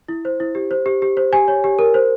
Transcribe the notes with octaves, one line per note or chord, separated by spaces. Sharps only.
E4
C5
E4
G4
C5
G4
G4
C5
G4 G#5
C#5
G4
A#4
C5